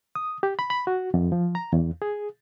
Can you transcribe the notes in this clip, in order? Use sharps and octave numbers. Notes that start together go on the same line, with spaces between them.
D#6
G4
B5
B5
F#4
F2
F3
A#5
E2
G#4